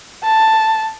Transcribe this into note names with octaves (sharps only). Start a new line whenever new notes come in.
A5